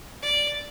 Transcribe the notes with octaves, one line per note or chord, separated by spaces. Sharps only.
D5